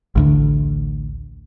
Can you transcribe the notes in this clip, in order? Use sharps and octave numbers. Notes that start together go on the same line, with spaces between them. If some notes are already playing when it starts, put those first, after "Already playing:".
A1 D2 D3